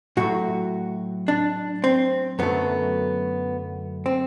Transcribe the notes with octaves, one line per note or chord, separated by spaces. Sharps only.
A2 F#3 A3 F#4
D4
C4
F#2 D3 F#3 A3 B3
C4